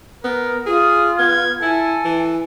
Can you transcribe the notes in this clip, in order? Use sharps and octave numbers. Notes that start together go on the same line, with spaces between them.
B3 A#4
F4 G#4 D#6
B3 G#6
E4 A4 G#5
E3